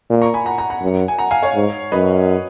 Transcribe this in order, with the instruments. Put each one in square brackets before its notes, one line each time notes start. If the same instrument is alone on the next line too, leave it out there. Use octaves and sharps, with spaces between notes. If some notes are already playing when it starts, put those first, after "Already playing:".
[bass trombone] A#2
[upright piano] A#5 C#6
G#5 B5
F#5 A#5
F#5 A#5
F#5 A#5
[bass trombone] F#2
[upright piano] G#5
F#5 A#5
F5 G#5
C#5 F5
[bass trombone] G#2
[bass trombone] F#2 [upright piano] B4 D#5